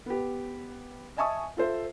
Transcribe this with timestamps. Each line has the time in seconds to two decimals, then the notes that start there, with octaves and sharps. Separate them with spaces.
0.06 B3 G4
1.17 D#5 E5 G#5 A5 C#6 D#6
1.57 F4 A4 C5 E5